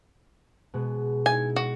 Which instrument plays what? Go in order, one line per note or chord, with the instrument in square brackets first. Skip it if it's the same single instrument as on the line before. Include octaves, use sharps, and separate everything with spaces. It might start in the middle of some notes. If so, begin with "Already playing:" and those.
[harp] B2 G#3 B3
[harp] D#4 E4 [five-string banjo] G#5
[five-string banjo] F#4